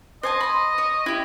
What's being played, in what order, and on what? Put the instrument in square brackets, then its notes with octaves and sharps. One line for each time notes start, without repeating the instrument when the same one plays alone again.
[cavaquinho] C5 G#5 A5 [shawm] D#5
[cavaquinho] B5 C6
C#5
E4 G4